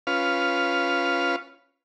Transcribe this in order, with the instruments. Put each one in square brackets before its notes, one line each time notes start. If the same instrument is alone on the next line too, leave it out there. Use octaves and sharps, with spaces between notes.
[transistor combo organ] C#4 F4 B4 F5